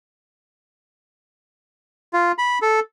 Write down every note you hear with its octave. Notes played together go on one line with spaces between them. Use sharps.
F4
B5
A4